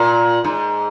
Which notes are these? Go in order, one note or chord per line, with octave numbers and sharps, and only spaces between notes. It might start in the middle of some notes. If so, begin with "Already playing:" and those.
Already playing: A#2
G#2